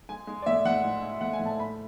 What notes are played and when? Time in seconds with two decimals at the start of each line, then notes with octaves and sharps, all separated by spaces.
0.09 G#3 G#5
0.27 G#3
0.42 D5
0.46 A2 E5
0.65 A2 F#5
0.83 G#3
1.02 G#3
1.21 A2 F#5
1.33 G#5
1.40 A2
1.46 A5
1.59 A3 B5